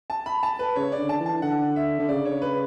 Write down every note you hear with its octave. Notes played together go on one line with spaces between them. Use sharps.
A5
B5
A5
B4
C#3 C#5
D5
D3
A5
E3
A5
D3 F#5
E5
D3
C#3 D5
C#5
B4